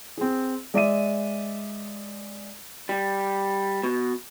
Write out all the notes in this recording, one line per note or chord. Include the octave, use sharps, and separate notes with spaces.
C4 G#4
G#3 D5 E5 D#7
G3
B2